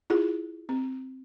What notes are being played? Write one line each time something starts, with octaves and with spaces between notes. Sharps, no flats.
E4 F4 G#4
C4